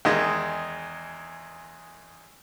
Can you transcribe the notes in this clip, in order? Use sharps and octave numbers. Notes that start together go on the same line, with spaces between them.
E2 D#3 G#3